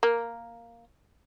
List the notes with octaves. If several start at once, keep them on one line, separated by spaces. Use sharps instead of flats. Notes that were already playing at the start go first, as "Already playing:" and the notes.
A#3